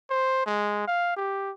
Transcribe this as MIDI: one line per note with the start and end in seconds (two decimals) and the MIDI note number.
0.10 0.43 72
0.46 0.86 56
0.87 1.14 77
1.17 1.51 67